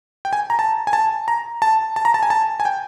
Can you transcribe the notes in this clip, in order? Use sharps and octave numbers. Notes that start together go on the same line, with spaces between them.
G5
G#5
A#5
A5
G#5
A5
A#5
A5
A5
A#5
A5
G#5
A5
G#5
G5